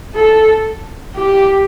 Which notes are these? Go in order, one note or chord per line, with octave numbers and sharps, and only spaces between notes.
A4
G4